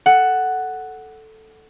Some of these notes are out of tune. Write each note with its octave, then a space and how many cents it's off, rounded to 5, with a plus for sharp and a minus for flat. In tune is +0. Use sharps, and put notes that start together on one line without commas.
A4 +0 F#5 +5